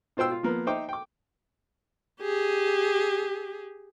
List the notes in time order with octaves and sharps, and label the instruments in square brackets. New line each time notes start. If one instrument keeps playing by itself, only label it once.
[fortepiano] B2 F4 C5 G5 E6
F4
F3 A#3 B3
D#4 C5 E5 G5 D6
G5 D6
[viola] G4 G#4